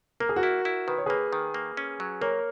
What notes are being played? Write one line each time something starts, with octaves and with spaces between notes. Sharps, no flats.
A#3 A#4
G#4
F#4 A#4
E4
E4
D#3 B4
C#5
A#3 G#4 B4
D#3
A#3
C#4
F#3
A#3 A#4 C#5